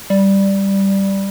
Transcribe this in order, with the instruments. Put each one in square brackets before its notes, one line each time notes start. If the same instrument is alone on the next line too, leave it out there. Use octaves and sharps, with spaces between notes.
[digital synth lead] G3